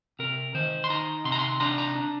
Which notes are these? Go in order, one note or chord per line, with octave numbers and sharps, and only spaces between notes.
C3 A#4
D#3 C5
C6
D#3 A#5
C3 C6
A#5
C6
D4 A#5
A#5
D4